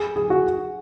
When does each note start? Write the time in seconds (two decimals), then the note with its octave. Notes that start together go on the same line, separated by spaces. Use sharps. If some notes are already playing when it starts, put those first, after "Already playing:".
Already playing: G#4
0.16 G#4
0.30 F#4